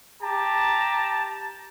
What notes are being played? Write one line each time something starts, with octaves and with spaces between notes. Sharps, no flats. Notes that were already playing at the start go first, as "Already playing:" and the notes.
G4 A5 A#5